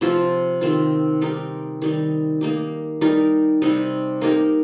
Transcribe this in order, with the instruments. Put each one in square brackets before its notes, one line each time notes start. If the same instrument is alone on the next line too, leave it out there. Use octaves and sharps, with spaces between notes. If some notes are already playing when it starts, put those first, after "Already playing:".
[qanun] C3 F3 C4 F4
C3 D#3 C4 F4
G3 D#4 G4 A#4
D#3 G3 D#4
A#3 D#4 G4
G3 D#4 G4 A#4
C3 G3 D#4
A#3 D#4 G4 A#4